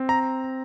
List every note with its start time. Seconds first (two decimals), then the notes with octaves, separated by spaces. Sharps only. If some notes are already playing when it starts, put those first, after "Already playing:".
Already playing: C4
0.09 A#5